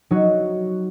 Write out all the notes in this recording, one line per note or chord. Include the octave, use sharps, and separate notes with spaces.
F#3 D#4 F#4